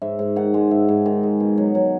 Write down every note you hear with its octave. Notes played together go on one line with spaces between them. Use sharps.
G#2 E5
G#2
D#3 F#5
G#3
G#2 E5
G#2
D#3
G#3
B2
F#3
F#3